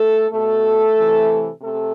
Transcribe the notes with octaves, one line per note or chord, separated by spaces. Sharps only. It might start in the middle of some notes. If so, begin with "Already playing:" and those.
Already playing: A3 A4
B2 A3 A4
C3 E3
C3 A3 A4